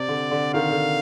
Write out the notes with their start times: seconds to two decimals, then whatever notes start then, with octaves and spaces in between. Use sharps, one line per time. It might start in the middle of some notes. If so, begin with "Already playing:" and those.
Already playing: C3 D5
0.08 D3
0.31 D3
0.54 D#3 F5
0.70 D3